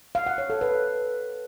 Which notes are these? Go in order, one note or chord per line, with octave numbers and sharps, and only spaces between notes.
F5
F#5
C#5
A4
B4